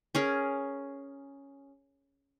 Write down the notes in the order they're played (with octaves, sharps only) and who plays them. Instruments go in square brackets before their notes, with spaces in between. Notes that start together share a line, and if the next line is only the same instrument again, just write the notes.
[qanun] C#4 G#4 A#4